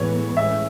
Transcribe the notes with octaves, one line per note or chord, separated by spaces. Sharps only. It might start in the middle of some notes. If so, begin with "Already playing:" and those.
Already playing: A2 E3 G#3 B3 C#5
A2 G#3 C#4 E5